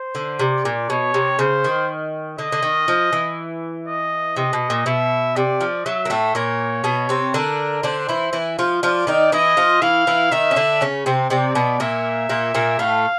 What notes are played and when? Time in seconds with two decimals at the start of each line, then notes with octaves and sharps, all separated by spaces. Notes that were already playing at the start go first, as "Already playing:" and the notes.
Already playing: C5
0.15 D3
0.39 C3 D5
0.65 A#2
0.89 B2 C#5
1.14 C3
1.39 C#3 C5
1.64 D#3
2.39 D3 D#5
2.52 D3
2.63 D#3
2.88 F3
3.13 E3
3.87 D#5
4.36 C3 D#5
4.53 B2
4.70 A#2
4.86 B2 E5
5.36 C3 D5
5.61 F3
5.85 F#3 E5
6.05 A#3
6.10 A2 A3
6.35 A#2 A#3 C#5
6.84 B2 B3
7.09 C3 C4
7.34 D3 D4 A#4
7.83 D3 D4 C5
8.09 E3 E4
8.33 E3 E4
8.59 F3 F4
8.83 F3 F4 D5
9.07 D#3 D#4
9.32 E3 E4 D#5
9.57 F3 F4
9.82 E3 E4 F5
10.07 E3 E4
10.31 D#3 D#4 E5
10.51 C#4
10.56 D3 D4
10.81 C#3 C#4
11.06 C3 C4
11.30 C3 C4 D5
11.55 B2 B3
11.80 A#2 A#3 E5
12.29 A#2 A#3
12.55 A#2 A#3
12.79 A2 A3 F5